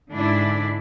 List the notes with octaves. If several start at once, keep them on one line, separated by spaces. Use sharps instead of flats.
G#2 D3 D4 E4